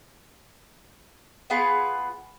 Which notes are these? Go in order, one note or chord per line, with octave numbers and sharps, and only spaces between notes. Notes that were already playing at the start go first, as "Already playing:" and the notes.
B3 F4 G#4 B4